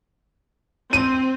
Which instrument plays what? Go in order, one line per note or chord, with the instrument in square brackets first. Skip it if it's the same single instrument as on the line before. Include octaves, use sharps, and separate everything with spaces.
[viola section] C4 [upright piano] D#7